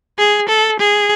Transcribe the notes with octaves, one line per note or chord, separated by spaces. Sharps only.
G#4
A4
G#4